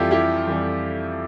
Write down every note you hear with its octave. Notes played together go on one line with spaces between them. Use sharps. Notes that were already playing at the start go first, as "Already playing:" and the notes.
Already playing: F2 E3 G3 E4 F4 G4 A4
E4 G4
F2 E3 G3